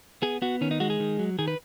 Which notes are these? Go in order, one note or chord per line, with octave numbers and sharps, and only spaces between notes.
B3 G#4
B3 F#4
D#3 C#4
D#4
G#3 F#4
G#4
D#3
F#3
D#3 G#4
B4